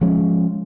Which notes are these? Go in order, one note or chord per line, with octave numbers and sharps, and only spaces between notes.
F3 G#3 C#4